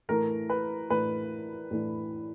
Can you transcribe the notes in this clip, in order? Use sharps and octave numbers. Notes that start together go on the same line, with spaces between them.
A2 E3 A3 D4 A#4
B4
A2 E3 A3 D4 B4
A2 E3 A3 D4